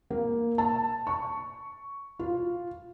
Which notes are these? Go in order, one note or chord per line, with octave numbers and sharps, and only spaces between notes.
A#3
A5
C#6
F4